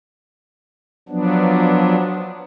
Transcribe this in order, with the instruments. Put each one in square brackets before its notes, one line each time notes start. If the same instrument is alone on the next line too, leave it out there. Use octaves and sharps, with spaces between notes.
[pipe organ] F3 F#3 B3 D4